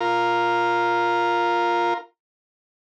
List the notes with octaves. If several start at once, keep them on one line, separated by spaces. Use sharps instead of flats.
F4 A#4 A#5